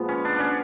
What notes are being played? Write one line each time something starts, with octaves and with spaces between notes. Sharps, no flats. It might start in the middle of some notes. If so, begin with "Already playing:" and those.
Already playing: A#2 F3 G#3 B3
C#4
D4
C#4 D4